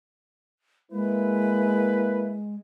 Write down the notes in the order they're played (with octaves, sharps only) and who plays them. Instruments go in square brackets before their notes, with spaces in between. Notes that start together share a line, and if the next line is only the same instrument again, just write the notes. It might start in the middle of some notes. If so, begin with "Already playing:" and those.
[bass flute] G#3 [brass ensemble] A#3 E4 B4